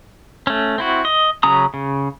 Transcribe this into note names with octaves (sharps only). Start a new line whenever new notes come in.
A3 C#4
C4 E4 F#4
D#5
C#3 F#3 C#4 A#5 D#6
C#3